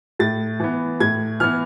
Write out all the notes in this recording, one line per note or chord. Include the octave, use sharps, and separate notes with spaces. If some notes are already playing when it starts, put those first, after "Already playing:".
A2 A6
E3 B3
A2 G#6
E3 B3 F6